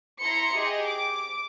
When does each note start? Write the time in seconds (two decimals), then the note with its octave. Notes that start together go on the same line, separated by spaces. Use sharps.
0.21 E4 A#5 C6 C#7
0.56 G4 G#4 D#5
0.87 D6